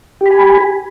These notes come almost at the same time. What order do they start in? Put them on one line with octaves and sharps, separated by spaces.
G4 B5 G#5